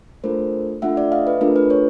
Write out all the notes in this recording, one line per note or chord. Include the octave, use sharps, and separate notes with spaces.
A3 D4 F4 A4 A#4 C5
A3 D4 F4 A4 E5 F#5
D5 E5
D#5 F5
B4
A3 D4 F4 A4 A#4
B4
B4 C#5